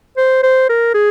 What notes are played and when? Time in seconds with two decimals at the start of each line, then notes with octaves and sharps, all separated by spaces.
0.17 C5
0.43 C5
0.69 A#4
0.94 G#4